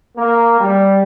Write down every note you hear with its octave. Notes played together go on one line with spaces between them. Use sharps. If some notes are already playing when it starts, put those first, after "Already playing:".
A#3
G3